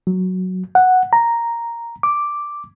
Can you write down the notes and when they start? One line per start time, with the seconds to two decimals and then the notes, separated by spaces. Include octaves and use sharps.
0.07 F#3
0.75 F#5
1.13 A#5
2.03 D6